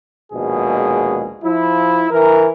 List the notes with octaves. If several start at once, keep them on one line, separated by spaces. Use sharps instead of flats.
A#1 D#2 B2 G#3 G#4
F3 E4
E3 A#4